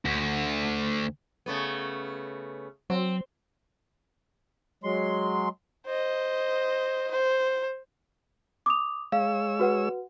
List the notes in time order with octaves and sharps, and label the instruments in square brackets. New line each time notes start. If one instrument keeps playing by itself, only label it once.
[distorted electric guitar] D2
[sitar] C#3 A3 B3
[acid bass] F#3 [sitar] C4
[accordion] F#3 G#3 C6
[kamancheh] C5 D#5
C5
[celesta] D6 D#6 F7
[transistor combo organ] G#3 C#5 E6 [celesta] F5
[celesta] F#4 B4 F#5